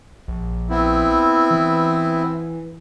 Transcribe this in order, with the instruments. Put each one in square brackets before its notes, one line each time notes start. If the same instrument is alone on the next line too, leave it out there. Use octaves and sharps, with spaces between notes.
[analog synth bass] A#1
[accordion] B3 C4 E4
[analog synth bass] E3